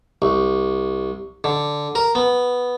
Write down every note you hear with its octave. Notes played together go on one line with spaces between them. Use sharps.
C2
D3
A#4
B3